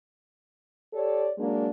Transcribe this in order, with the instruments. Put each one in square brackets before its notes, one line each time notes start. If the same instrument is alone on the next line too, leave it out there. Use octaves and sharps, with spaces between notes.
[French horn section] G4 A4 C#5 D5
F#3 G#3 A#3 D4